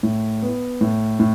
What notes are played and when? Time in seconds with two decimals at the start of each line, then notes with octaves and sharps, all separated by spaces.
0.03 A2
0.43 B3
0.81 A2
1.20 A2